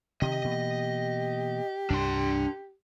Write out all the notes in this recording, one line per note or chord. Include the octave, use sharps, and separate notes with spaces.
C3 D#3 G4 D#5
B2 E3 A#3
C2 G2 D4 C6